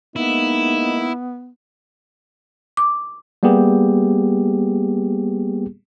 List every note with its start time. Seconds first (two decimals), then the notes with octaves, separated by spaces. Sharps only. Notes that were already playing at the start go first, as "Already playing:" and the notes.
0.16 G#3 A#3 B3 D#4 E4
2.77 D6
3.43 G3 A#3 B3 G4 G#4